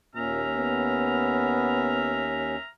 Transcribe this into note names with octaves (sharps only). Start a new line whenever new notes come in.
D#2 A#2 C#4 E5 A#5 F6
B3